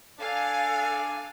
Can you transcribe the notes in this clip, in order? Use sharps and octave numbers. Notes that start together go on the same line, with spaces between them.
D4 A4 F5 G#5